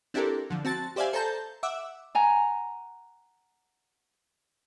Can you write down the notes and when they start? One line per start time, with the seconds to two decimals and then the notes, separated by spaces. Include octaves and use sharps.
0.14 C4 D4 E4 G4 A4 A#4
0.50 D3 F3
0.65 C4 F#4 A5 A6
0.96 G4 C5 D5 E5 F5 G#5
1.13 A4 C5 A5 A#5 G6
1.63 E5 F#5 D6 E6
2.15 F#5 G#5 A#5